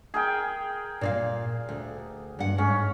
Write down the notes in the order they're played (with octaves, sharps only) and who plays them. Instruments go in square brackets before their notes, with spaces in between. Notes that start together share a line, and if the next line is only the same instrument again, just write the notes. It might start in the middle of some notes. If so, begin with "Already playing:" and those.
[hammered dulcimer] G#4 A#4 G5
[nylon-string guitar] A#2 D5 F5
D2
G2 F#5
[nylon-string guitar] G#2 [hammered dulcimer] C#4